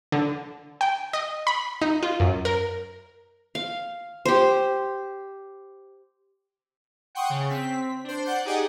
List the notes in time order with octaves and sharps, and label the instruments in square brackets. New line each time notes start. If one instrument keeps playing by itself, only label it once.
[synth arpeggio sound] D3
G5
D#5
B5
D#4
F4
F#2
A#4
[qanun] F5
G4 C5
[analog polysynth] F#5 G5 C6 C#6 D#6
C#3
C4 B6
D4 C5
D5 F#5 G6
D#4 G4 G#4 D5 D#5 F#5